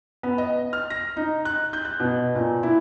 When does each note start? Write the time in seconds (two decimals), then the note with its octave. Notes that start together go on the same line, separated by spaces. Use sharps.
0.23 B3
0.38 D#5
0.73 F6
0.90 A#6
1.17 D#4
1.45 F#6
1.73 G6
1.85 F#6
2.00 B2
2.35 A#2
2.63 E4